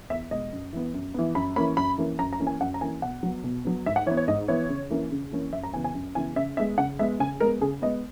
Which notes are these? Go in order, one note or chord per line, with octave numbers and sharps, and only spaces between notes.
E2 E5
B2 G#3 D#5
F#2
E3 B3
F#2
E3 B3
F#2 B5
E3 A#3 C#4 B5
F#2 B5
E3 A#3 C#4
F#2 A#5
A#5
E3 A#3 C#4
G#5
F#2 F#5
A#5
E3 A#3 C#4 G#5
B2 F#5
F#3 B3
B2
F#3 B3
G#2 E5
F#5
E3 B3 C#5
C#5
G#2 D#5
E3 B3 C#5
C#3
E3 A#3 C#4
C#3
E3 A#3 C#4
F#2 E5
A#5
C#3 E3 B3 G#5
G#5
F#2
C#3 E3 B3 G#5
C#3 E5
G#3 B3 E5
C#3 F#5
G#3 B3 E5
C#3 G#5
G#3 B3 A#4
C#3 G#4
G#3 B3 D#5